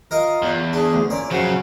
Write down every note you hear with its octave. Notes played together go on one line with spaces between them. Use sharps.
F4 A#4 D#5 F5
E2
D4 G#4
D2
A#2 C#4 D5
F#2 C#3 F3 F#4